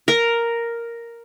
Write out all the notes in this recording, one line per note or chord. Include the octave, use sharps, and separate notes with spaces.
A#4